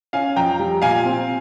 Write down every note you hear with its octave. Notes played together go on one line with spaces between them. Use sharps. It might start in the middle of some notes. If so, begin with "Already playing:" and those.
C#4 F5 G#5
F2 G5 A#5
G3
A#2 F5 G#5
C4